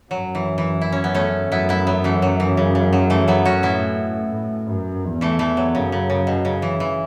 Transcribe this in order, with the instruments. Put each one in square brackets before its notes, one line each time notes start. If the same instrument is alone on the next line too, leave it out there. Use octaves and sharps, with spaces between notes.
[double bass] F#2 [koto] F#3
[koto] E3
E3
E4
C#4
B3
A3 C#4
[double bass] F#2 [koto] B3 E4
[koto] B3 E4
F#3 B3
E3 A3
F#3
E3
C#3
C#3
F#3
E3 A3
F#3 B3
C#4 F#4
[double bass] A2 [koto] B3 E4
[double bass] A2
F#2
E2
[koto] E3 A3
E3 A3
F#3
[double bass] F#2 [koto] C#3
[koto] C#3
C#3
B2
C#3
E3
E3